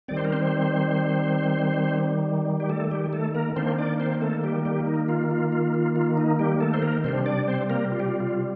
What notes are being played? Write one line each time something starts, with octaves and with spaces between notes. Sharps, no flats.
D#3 G3 C4 D5
C5
A#4
C4 C5
G4
A3 A4
G3 G4
A3 A4
A#3 A#4
D#3 A#3 C4 D4 C5
D4 D5
C4 C5
A3 A4
G3 G4
G3 G4
D#4
F4
F4
F4
F4
F4
D#4
G3 G4
A3 A4
C5
A#3 A#4
C3 G3 C4 D4 C5
D4 D5
C4 C5
A#3 A#4
F4
G4
F4
F4